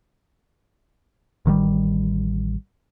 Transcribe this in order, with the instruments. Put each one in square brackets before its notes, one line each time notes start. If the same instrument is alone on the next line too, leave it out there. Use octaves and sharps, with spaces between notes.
[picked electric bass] A1 D#3 F3 G3